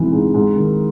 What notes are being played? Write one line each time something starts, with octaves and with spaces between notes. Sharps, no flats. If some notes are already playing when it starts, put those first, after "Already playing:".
Already playing: G#2 C3 E3 G#3
G#2
G#2
D#3